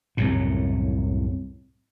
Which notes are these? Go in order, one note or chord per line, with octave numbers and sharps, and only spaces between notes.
C2 F#2 A2